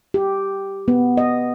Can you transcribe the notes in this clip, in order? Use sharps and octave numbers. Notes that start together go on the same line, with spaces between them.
G4
B3
D#5